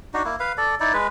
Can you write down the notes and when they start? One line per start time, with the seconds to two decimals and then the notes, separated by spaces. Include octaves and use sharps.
0.14 D4 D#4 F#4
0.25 A#3 E4
0.40 B4 F5
0.58 A4 D5
0.80 D#4 E4 D5
0.94 G#3 B4